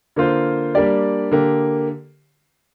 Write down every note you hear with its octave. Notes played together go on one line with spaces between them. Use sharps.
D3 A#3 F4 C5
G3 A#3 D4 G4 D5
D3 A#3 G4